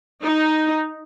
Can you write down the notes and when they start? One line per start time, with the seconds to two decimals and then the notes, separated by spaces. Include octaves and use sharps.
0.23 D#4